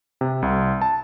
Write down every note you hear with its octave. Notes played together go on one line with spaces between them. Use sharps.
C3
C2
A5